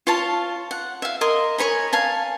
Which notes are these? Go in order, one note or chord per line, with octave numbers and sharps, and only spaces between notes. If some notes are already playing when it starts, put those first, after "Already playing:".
F4 C#5 F5 A5
F#5
E5 F5
A#4 D#5 C6
A#4 C#5 G#5 B5
F5 G#5 A5